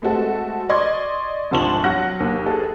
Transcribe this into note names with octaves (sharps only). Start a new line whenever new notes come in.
G#3 A3 C4 F#4 A4
D5 D#5 C6 C#6 G#6 A6
G#1 D2 F3 A5 C#6 F#7
F#3 F#5 F#6 A#6
D#2
G#4 A4